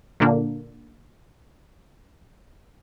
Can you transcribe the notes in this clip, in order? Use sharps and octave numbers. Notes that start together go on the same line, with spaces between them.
A#2 D3 A#3 D4